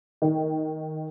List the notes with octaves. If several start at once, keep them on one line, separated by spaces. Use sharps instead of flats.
D#3